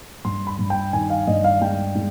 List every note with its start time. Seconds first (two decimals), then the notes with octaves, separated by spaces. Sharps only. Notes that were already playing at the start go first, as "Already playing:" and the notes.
0.25 G2 C6
0.47 B5
0.59 G2
0.70 G5
0.93 D#3 G#5
1.10 F5
1.27 G2 D#5
1.44 F5
1.61 G#3 G5
1.95 G#3